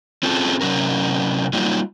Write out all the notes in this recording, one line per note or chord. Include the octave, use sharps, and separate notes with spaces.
C4 C#4 F4 G#4 A4
C3 F#3 C#4 A#4
F#3 G3 A#3 D#4 F4